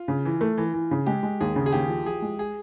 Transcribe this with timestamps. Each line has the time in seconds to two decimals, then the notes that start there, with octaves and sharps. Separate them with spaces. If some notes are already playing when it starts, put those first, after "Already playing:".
Already playing: F4
0.08 C#3
0.25 E3
0.41 A3
0.58 E3
0.74 E3
0.91 C#3
1.06 G#3 G4
1.23 G#3
1.41 D#2 G#4
1.56 C#3
1.66 G#4
1.72 D#2 G4
1.89 F3
2.05 F3 G#4
2.22 G#3
2.39 G#4